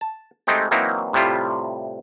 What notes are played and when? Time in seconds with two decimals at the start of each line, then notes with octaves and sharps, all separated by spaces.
0.01 A5
0.47 G#3 A3 C4 D#4 G4
0.71 E3 F#3 A#3 C4 D#4 E4
1.13 A2 C3 G3 E4 F4